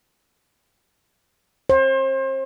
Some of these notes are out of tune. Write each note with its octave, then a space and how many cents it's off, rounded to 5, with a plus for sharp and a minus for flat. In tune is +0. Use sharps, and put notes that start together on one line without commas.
C5 +35